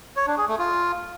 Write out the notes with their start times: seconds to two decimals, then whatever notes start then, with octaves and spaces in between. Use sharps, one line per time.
0.16 C#5
0.27 D4
0.38 G#4
0.48 A3
0.59 F4